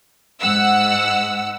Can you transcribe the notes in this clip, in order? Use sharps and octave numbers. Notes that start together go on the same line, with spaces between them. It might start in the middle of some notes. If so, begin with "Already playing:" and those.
G#2 F#5 E6